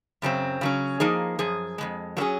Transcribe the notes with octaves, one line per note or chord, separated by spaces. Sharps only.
F#2 C#3 F#3 C4
C#3 F#3 C#4
F3 A#3 D#4 G#4
F#2 F3 G#4
F2 C#3 G#3
F#3 A#3 C#4 G#4